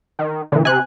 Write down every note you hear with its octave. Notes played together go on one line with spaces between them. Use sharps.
D#3
A#2 D3 E3
C3 G#5 F#6